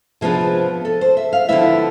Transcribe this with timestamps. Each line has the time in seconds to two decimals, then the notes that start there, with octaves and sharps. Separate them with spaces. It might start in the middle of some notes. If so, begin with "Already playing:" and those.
0.21 C3 F3 B3 D4 G#4
0.85 A4
1.01 C5
1.17 E5
1.33 F5
1.49 D3 F3 B3 E4 E5